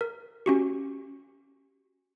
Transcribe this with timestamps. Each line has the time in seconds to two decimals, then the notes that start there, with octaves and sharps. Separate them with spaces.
0.01 A#4
0.46 C#4 F#4 G4